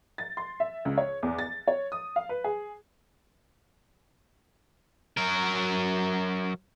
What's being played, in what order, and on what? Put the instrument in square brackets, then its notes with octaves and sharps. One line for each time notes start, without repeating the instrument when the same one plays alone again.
[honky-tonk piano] A6
C6
E5
C#2
C#5
E2
A6
C#5
D#6
F5
B4
G#4
[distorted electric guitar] F#3 A#4